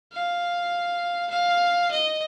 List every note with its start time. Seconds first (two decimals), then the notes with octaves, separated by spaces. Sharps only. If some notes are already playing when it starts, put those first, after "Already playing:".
0.13 F5
1.31 F5
1.91 D#5